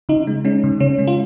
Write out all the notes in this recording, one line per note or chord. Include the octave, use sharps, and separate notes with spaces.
C#3 D#4
G#3
G#3 C#4
C#3
C#3 C#4
G#3
F4